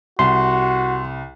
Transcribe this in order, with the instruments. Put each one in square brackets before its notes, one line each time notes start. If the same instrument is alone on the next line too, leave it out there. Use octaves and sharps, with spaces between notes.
[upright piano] C2 [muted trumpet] F#4 [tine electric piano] C6